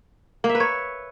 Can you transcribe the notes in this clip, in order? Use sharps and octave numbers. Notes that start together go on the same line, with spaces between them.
A#3
E5
B4
C#5